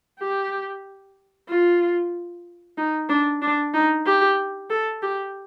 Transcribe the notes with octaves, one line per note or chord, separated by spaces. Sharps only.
G4
F4
D#4
D4
D4
D#4
G4
A4
G4